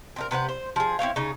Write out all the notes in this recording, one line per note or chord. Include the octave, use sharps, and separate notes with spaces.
C4 D#4 A#4
C3 B4 C5 F#5
C5
F3 G#4
C4 E4 C#5 F5
C#3 D#4